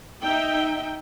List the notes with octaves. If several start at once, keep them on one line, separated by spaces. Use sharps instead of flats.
D#4 E5 G5